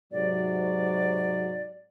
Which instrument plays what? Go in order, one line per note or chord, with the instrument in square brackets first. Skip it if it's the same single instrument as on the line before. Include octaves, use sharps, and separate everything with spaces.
[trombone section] G#2 C3 F#3 [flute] D5